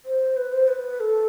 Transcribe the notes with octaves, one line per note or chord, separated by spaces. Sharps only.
C5
B4
C5
B4
A4